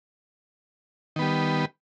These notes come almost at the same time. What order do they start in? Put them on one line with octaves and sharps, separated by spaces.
D#3 B3 G3